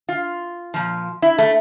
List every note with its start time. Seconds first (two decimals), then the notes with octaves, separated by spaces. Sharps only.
0.09 F4
0.74 A#2 F3
1.22 E4
1.39 A3